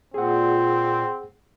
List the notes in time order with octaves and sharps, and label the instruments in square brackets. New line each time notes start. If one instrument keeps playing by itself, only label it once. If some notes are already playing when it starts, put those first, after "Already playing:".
[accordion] A#2 [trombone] C4 [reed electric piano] G#4 F#5